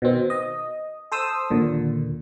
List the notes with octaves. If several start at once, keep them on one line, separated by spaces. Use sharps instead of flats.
B2 D#3 C4
D#5
A4 C5 D#6 E6
D#2 A#2 D3